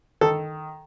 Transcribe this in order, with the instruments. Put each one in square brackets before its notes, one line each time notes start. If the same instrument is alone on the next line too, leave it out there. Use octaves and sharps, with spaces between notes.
[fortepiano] D#3 A4